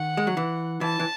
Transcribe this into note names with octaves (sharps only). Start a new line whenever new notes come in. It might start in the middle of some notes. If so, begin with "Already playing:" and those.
Already playing: D#3 F#5
G#3
F#3
E3
E3 A5
E3